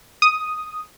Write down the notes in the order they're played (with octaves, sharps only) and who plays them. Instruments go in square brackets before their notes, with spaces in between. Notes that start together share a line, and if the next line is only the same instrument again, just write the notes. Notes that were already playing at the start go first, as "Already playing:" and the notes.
[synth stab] D#6